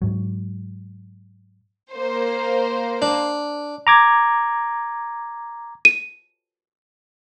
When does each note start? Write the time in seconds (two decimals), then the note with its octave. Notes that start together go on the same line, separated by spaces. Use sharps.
0.02 G#2 F#3
1.92 A#3 C5
3.02 D4
3.87 A#5 D6 G#6
5.85 D#7